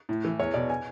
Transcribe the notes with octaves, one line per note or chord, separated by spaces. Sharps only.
A2
E3
E2 C#5
B2 D5
G#5